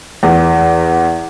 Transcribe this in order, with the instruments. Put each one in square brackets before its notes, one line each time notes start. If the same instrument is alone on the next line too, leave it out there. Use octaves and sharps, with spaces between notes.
[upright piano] E2